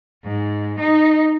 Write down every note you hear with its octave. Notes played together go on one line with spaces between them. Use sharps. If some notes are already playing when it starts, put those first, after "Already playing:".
G#2
D#4